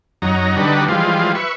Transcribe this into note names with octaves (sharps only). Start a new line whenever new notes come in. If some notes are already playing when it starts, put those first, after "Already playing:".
F#2 F#3 D#4 A#5
D3 G3 D4 D#4 F#4 B4
E3 F3 G3 G#3 F4
B4 E5 C#6